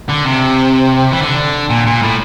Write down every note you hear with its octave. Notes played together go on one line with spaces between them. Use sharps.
D3
C3
E3
D3
A#2
A#2
A2